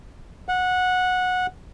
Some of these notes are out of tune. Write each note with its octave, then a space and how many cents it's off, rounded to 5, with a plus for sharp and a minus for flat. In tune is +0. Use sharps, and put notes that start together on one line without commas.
F#5 -15